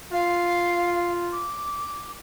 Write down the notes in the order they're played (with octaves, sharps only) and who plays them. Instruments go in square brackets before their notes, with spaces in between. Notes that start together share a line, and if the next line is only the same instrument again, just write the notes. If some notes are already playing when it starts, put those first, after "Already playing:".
[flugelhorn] F4 [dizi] F5
[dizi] D6